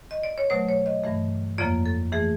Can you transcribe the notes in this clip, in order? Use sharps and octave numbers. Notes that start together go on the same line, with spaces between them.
D#5
D5
C#5
B2 F#3 A3 C5
C#5
D#5
G2 E3 A3
F2 C#3 F3 A#3 D5
A4
E3 A3 G#4